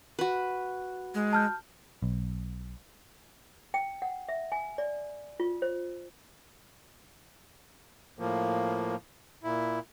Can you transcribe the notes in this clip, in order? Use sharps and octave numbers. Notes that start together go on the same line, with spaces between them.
F#4 B4
G#3
A5 F6 G6
B1
G5
F#5
E5
G#5
D5
F4
C5
A2 F3 A#3
A#2 E4